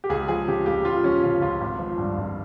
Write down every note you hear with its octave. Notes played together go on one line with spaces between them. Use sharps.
G4
C#2 G#4
F3 G#4
C#3 G4
C#2 G4
C#2 F4
F3 C#4
C#3 F4
C#2 F4
G#1
F3
G2
G#1